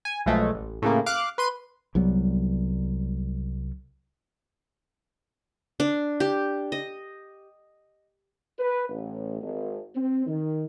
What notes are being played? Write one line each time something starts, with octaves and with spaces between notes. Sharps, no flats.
G#5
B1 B2 F3 G#3 A3
A1
A2 C#3 A#3
F5 D6 F#6
B4 C6 D#7
C2 F#3 G3 B3
D4
G4
D#5
B4
A1
G#1
C4
D#3